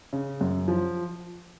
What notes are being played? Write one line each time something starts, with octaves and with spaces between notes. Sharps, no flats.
C#3
F#2
F3